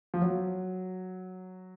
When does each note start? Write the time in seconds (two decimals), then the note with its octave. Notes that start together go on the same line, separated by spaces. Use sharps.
0.14 F3
0.22 F#3